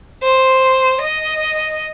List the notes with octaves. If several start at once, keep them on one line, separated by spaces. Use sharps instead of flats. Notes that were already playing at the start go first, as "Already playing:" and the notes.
C5
D#5